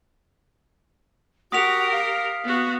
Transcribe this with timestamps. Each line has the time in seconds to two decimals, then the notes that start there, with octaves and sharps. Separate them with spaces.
1.52 F#4 G4 A#4 F#5 D#6 B6 F7
1.91 F5
2.44 B3 F#4